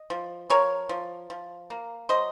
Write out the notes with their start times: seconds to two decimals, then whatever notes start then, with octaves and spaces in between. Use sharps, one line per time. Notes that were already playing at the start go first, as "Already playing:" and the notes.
Already playing: D#5
0.10 F3
0.50 F3 A#4 C#5
0.89 F3
1.30 F3
1.70 A#3
2.09 F#3 C5 D#5